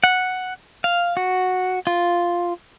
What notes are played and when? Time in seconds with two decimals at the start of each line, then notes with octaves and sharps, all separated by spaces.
0.04 F#5
0.84 F5
1.17 F#4
1.87 F4